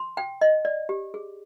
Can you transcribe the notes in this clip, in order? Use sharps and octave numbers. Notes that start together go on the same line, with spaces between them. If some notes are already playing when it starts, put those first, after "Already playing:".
Already playing: C6
G5
D#5
D5
G4
G#4